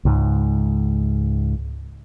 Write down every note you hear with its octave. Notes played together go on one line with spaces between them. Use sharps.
C#2 G#2